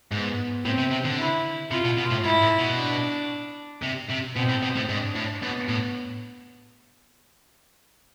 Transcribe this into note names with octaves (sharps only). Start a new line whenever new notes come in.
G#2 B3
A2 C4
C3
C3
D3
E4
C3 F4
B2
B2
A2
G#2 E4
A2
B2
D4
C3
C3
B2 C4
A2
B2
A2
G#2 D4
A2
B2 B3
A2